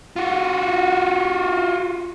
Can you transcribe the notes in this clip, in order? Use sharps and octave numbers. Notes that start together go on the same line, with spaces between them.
F4 F#4